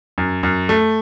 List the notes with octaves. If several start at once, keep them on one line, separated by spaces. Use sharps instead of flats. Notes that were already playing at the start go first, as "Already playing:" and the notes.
F#2
F#2
A3